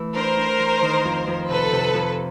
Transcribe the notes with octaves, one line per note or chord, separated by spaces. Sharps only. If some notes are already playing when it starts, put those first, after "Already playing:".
Already playing: E3 A3
D4 A#4 C5
D4
E3
D#3
F2
F2
C3 A4 B4
C3
F2